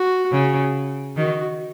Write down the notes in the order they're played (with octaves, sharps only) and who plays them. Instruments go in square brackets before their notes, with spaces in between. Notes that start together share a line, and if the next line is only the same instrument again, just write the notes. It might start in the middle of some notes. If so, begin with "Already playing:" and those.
Already playing: [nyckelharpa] F#4
[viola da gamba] C#3
[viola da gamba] D#3 [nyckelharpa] F#4